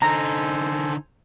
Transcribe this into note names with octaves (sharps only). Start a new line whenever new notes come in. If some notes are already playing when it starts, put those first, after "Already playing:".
D3 D#4 A4 C5 G#5 A#5